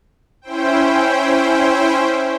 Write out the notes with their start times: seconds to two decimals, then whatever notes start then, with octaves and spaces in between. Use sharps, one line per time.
0.42 C#4 E4 C5 G5